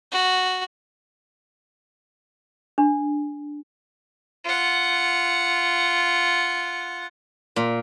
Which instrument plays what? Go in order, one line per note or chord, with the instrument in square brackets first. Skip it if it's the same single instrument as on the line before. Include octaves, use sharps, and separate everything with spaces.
[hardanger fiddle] F#4
[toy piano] D4
[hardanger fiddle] F4 F#5
[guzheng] A#2